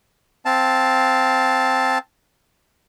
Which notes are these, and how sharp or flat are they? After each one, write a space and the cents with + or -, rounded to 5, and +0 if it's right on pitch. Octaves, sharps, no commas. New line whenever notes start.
C4 +0 F5 +0 A5 +0